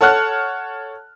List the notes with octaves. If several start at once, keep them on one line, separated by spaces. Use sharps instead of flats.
A4 C#5 F#5 A5 F6 F#6